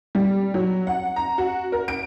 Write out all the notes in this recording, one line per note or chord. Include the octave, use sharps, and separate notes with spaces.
G3
F#3
F#5
A#5
F#4
A#4
D7